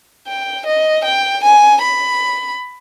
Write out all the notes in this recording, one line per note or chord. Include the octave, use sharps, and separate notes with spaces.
G5
D#5
G5
G#5
B5